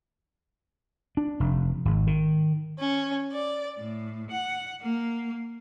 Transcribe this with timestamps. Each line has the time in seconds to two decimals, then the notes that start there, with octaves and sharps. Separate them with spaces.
1.17 D4
1.40 F1
1.85 G#1
2.07 D#3
2.79 C#4
3.33 D5
3.79 A2
4.30 F#5
4.81 A#3